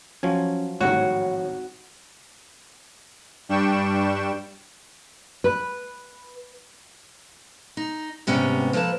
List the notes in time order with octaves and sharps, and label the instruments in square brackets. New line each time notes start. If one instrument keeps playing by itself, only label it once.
[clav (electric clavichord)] F3 F#3 G#5 [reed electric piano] C#4
[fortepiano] G#1 A2 G3 [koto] F#4 [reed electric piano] C#5
[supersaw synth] G2 G3 D4 G5 C#6 E7
[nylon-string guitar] B4
[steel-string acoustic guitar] D#4
G#2 C3 G3 B3 C#4
F3 A#3 A4 B4 A5